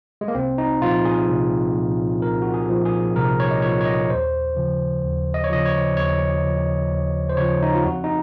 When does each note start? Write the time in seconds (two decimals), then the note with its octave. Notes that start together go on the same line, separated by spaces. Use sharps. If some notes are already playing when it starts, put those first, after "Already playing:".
0.21 G#3
0.28 A#3
0.35 C2 C4
0.58 D#4
0.82 A#2 F3 F4
1.05 G#4
1.29 C2
1.75 A#2 F3
2.22 C2 A#4
2.42 F#4
2.54 G#4
2.69 A#2 F3
2.85 G#4
3.16 C2 A#4
3.40 C#5
3.51 D#5
3.62 A#2 F3 C#5
3.81 C#5
3.85 D#5
4.09 D#2 C5
4.56 C#3 F3
5.03 D#2
5.34 D#5
5.44 C#5
5.50 C#3 F3 D#5
5.65 C#5
5.97 D#2 C#5
6.43 C#3 F3
6.90 D#2
7.29 C5
7.37 C#3 F3 C#5
7.62 D#4
7.73 F4
7.84 F2 F#4
8.04 D#4